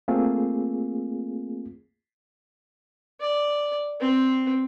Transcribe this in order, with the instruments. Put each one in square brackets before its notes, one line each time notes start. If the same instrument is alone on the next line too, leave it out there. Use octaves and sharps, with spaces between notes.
[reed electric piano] A3 A#3 C4 F4 G#4
[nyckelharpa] D5
C4